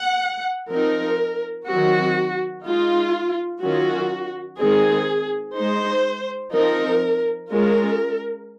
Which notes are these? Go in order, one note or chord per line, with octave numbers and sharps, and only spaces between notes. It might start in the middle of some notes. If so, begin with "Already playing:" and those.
Already playing: F#5
F3 C4 D#4 A#4
D#3 F#3 C4 F#4
G#3 D#4 F4
D#3 F#3 C#4 F4 F#4
D#3 G#3 C4 D#4 G#4
G#3 D#4 C5
F3 C4 D#4 A#4
G#3 C#4 F4 A#4